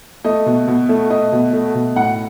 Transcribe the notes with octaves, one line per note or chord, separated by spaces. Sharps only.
A3 D#5
B2
B2
A3
A3 D#5
B2
A3
B2
A2 F#5